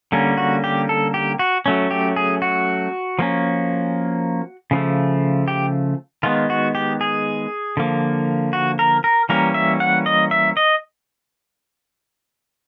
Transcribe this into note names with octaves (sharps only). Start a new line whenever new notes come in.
D3 G3 A#3 C#4
F#4
G4
A4
G4
F#4
F#3 A3 C#4
G4
G#4
F#4
F3 A#3 C#4
C#3 F3 A3
G4
D#3 G#3 B3 F4
F#4
G4
G#4
D3 F3 A#3
F#4
A#4
A#4
E3 G3 A#3 C#4 A#4
E5
F#5
D#5
E5
D#5